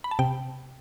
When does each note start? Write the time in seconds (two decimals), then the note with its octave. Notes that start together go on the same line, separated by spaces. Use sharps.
0.04 B5
0.11 A5
0.19 C3 G5